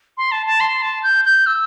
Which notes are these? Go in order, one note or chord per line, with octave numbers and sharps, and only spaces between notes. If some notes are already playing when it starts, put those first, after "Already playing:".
C6
A5
A5
C6
A5
G6
G6
E6